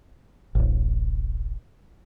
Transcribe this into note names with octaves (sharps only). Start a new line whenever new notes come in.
D1 A1